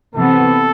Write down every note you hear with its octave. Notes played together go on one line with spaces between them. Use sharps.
C3 E3 B3 A4